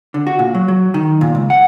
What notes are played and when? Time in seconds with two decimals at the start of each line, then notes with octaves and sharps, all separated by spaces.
0.14 D3
0.27 F#4
0.39 A#2
0.55 F#3
0.68 F#3
0.94 D#3
1.21 A#2
1.35 C#2
1.50 F#5